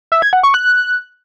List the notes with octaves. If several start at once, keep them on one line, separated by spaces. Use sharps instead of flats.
E5
G#6
F#5
C#6
F#6